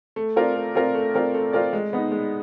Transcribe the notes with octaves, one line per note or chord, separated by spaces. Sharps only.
A3
C4 F4 A#4 D5
A3
C4 F4 A#4 D5
A3
C4 F4 A#4 D5
A3
C4 F4 A#4 D5
G#3
B3 D#4
G#3